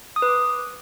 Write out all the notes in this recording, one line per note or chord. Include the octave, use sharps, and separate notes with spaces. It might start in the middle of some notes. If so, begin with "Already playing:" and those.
D#6
B4
D6